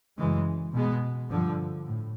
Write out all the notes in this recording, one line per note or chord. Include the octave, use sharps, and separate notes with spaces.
F#2 C#3 E3 G#3
B2 G#3 B3
G2 D3 F3
A2